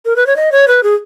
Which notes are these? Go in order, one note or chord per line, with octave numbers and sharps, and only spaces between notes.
A#4
B4
C#5
D#5
C#5
B4
G#4